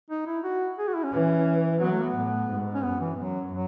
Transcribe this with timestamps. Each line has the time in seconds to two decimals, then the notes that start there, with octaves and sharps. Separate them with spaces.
0.10 D#4
0.27 E4
0.44 F#4
0.78 G#4
0.88 F#4
0.95 E4
1.03 C#4
1.12 E3
1.81 F#3 B3
1.91 A3
2.02 B3
2.15 A2
2.49 G#2
2.74 C#4
2.84 F#2 B3
3.00 E3
3.17 F#2 F#3
3.52 F#3